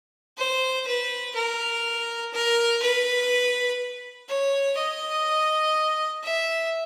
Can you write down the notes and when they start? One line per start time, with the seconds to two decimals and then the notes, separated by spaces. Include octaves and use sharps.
0.37 C5
0.87 B4
1.35 A#4
2.33 A#4
2.82 B4
4.28 C#5
4.77 D#5
6.23 E5